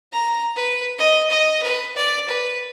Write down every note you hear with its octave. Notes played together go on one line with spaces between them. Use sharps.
A#5
B4
D#5
D#5
B4
D5
B4